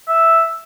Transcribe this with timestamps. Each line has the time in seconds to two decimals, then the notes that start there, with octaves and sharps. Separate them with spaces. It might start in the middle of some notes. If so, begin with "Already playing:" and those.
0.08 E5